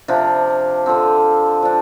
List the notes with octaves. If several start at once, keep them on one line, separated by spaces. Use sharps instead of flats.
C3 F3 D4
D3 F3 C4
F3 D4